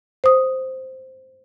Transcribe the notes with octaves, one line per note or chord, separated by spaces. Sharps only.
C5 D#6